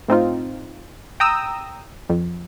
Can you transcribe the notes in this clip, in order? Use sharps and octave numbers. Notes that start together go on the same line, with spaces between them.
A2 C4 D#4 F4
G5 A#5 D#6 E6
F2